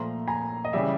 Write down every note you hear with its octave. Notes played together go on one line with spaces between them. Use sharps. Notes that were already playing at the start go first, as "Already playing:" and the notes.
Already playing: A#2 F3 A3 A#5 C6
G#5 A#5
D#5
C#3 E3 G3 D5 E5